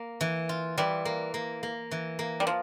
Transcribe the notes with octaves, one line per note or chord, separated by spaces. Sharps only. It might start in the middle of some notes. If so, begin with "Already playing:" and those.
Already playing: A#3
E3
F4
E3 G3
A#3
A#3
A#3
E3
A#3
G3
F3